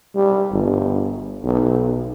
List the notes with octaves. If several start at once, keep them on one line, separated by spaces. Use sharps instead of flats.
G3
G1
B1